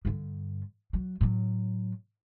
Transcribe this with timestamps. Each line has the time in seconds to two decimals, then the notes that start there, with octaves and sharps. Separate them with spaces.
0.05 G2 D3
0.93 F#3
1.21 A2 F#3